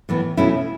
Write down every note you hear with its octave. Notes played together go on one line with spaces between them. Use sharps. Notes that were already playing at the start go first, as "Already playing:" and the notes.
A2 E3 B3
B2 A3 C#4 E4